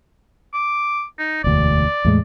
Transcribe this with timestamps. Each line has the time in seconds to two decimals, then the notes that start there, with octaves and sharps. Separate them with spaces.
0.54 D6
1.19 D#4
1.44 E1 D2 D5
2.05 E2 A2 G#3